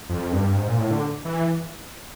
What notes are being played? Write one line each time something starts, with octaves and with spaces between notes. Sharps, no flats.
F2
G2
G#2
A#2
A2
D3
E3